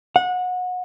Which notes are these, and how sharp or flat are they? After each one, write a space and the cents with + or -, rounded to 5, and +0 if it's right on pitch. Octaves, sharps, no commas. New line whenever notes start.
F#5 -25